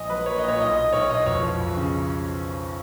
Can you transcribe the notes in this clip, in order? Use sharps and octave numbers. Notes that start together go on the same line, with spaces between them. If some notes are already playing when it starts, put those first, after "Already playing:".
Already playing: A#1 D#5
F#3 B4
A#3 C#5
D#5
A#2
C#5
B1 D#5
A#3 D#5
B1 C#5
B2 D#5
F2 C#5
F3
F2
C#3